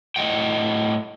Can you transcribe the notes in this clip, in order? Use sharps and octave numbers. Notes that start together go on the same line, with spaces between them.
A2 D#5 F#5 G5